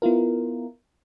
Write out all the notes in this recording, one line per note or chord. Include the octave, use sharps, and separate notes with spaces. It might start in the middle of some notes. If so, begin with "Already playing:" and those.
B3 E4 F4 A#4